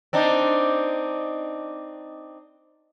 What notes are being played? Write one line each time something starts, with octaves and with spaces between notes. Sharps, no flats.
C4 D4 D#4